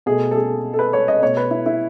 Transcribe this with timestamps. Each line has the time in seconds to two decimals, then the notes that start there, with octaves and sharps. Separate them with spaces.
0.06 B2 A3 G#4
0.31 A4
0.35 G#4
0.73 A4
0.79 B4
0.93 C#5
1.08 D#5
1.22 B2 A3 C#5
1.37 B4
1.51 E4
1.66 E4